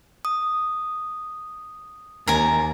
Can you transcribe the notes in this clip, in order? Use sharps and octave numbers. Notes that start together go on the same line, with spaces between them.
D#6
D#2 A#4 G#5 A#5